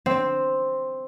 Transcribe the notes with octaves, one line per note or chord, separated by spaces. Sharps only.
C4